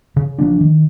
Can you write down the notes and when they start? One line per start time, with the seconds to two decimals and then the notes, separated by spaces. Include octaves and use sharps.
0.16 C#3
0.39 F3 A#3 D4
0.61 D#3